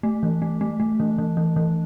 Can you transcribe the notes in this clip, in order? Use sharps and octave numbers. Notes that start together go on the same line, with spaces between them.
A3
E3
A3
A3
A3
E3
E3
E3
E3